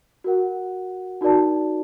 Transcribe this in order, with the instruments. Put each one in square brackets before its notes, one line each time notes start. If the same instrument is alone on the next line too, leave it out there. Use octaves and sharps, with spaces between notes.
[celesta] F#4 A#4 F#5
D#4 F#4 A#4 D5 A5